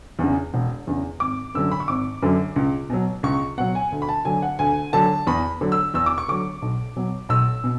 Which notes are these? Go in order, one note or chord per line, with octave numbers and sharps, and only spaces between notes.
E2 C#3
E1
E2 C#3
G#1 D6
F#2 D3 F#3 E6
B5
C#6
G#1 D6
F#2 D3 F#3
C#2
B2 F#3
C#2 C#6
B2 F#3 F#5
G#5
D2
B5
A5
D3 F#3 G#5
F#5
D2 G#5
D3 F#3 A5
E2 B5
D3 F#3
E6
E2 E6
D6
C#6
D3 F#3 D6
B1
B2 F#3
B1 E6
B2